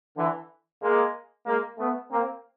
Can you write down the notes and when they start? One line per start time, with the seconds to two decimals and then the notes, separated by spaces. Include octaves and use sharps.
0.17 D3 E3
0.81 G#3 A#3
1.46 G#3 A#3
1.78 A3 B3
2.10 A#3 C4